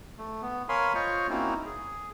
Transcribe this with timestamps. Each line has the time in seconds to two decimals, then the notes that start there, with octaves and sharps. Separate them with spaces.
0.18 A3
0.42 B3
0.69 A#4 C#5 F5 G#5 B5 C6
0.95 F4 C5 C#5 D#5 F5 C#6
1.29 A#3 C4 C#4 D#4 E4 F#4
1.66 G#4